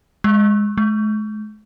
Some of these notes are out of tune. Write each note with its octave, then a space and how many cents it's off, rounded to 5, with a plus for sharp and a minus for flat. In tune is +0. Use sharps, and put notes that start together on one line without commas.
G#3 -5
G#3 +45